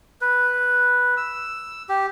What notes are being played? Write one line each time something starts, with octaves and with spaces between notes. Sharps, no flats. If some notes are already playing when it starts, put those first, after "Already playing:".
B4
E6
G4